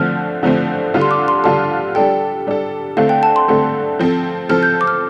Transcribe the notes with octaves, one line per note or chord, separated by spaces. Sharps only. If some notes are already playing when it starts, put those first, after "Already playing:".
Already playing: D3 F3 A3 C4 F6
D3 F3 A3 C4
D3 G3 D4 F4 A4
C6
D6
C6
D3 G3 D4 F4 A4 A5
G3 D4 A4 G5
G3 D4 A4
D3 A3 C4 A4 F5
G5
A5
C6
D3 A3 C4 A4
F3 C4 A4
F3 C4 A4 F6
G6
D6
F6